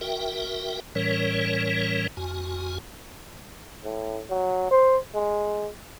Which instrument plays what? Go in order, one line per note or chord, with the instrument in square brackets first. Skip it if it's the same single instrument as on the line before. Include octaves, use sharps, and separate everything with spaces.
[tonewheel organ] F#4 A#4 E5 G5
A2 E3 G3 C#4 A#4 C#5
F2 F#4 G#5
[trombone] A2
F#3
C5
G#3